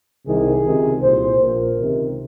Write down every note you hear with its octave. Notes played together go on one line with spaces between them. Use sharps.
C2 C3 D#3 G#4
C#2 C3 D#3
C2 A#2 C5
A#1 A#2 A#4
C#2 C3 D#3